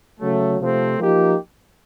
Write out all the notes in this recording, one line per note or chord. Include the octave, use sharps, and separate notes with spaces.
C#3 F#3 A3
C3 F3 A3 C4
F3 A#3 D#4 G4